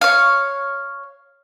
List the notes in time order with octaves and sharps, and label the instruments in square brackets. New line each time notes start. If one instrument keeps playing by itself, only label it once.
[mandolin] C#5 F5